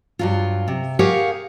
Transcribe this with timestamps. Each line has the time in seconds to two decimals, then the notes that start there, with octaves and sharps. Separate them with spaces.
0.19 G2 F#3 F4
0.68 C3
0.99 G4 G#4 A#4 C#5 F5 F#5